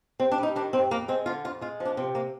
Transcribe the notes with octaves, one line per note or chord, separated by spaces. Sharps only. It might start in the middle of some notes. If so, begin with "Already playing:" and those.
G2 C4
D4
G3 D#4
D#3 D4
G2 C4
F2 A#3
G#3 C4
D3 F4
F2 F4
G#3 F4
F3
D4
C3 C4
A#3